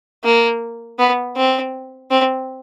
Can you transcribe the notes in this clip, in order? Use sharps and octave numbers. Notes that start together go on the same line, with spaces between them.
A#3
B3
C4
C4